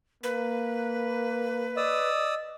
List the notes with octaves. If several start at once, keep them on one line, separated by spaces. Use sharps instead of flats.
A#3 B4
D5 D#5 D#6 E6